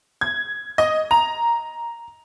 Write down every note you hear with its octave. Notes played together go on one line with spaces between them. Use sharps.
G#6
D#5
A#5